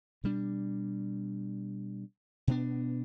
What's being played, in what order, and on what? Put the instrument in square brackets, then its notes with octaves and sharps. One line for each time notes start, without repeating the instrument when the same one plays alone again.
[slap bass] B2 G3 D4
B2 B3 D4